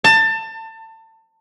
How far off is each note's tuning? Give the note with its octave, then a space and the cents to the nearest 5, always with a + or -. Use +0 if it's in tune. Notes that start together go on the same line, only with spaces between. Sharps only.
A5 +25